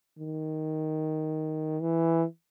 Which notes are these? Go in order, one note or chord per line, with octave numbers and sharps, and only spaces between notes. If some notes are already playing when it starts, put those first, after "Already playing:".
D#3
E3